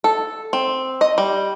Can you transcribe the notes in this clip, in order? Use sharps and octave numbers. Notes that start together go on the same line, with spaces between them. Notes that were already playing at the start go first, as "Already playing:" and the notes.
A4
C4
D#5
G3